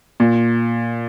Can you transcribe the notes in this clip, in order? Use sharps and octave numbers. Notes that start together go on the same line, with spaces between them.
A#2